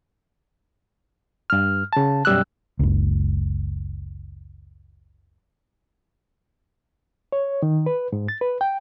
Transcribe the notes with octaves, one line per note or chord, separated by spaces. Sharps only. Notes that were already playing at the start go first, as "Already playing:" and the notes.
G2 F6
C#3 A5
F#2 B2 G3 E6 F#6
F#1 C#2
C#5
D#3
B4
G#2
A6
B4
G5